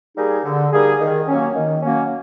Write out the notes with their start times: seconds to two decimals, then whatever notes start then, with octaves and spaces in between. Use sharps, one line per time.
0.17 G3 A#3 D#4 G#4
0.45 D3
0.72 G3 A#3 D#4 G#4
1.00 D#3
1.28 F#3 A#3 C#4
1.55 D#3
1.82 F#3 A#3 C#4